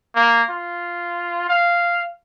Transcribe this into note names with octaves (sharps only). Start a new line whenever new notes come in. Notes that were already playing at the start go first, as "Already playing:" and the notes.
A#3
F4
F5